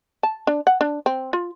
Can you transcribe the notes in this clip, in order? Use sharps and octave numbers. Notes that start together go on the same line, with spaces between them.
A5
D4
F#5
D4
C4
F4